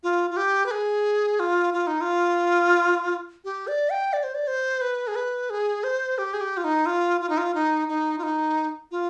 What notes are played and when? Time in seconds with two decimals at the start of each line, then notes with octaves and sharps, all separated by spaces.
0.03 F4
0.30 F4
0.37 G4
0.66 B4
0.71 G#4
1.39 F4
1.73 F4
1.87 D#4
2.01 F4
3.44 G4
3.67 D5
3.90 G5
4.13 D5
4.23 C5
4.34 D5
4.47 C5
4.81 B4
5.07 G#4
5.15 B4
5.50 G#4
5.84 C5
6.18 G4
6.33 G#4
6.40 G4
6.57 F4
6.64 D#4
6.86 F4
7.21 F4
7.29 D#4
7.38 F4
7.55 D#4
7.88 D#4
8.18 F4
8.23 D#4
8.91 F4